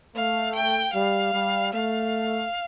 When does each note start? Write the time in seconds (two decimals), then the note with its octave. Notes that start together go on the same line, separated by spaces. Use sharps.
0.15 A3 F5
0.55 G5
0.94 G3 F5
1.34 G3
1.73 A3 F5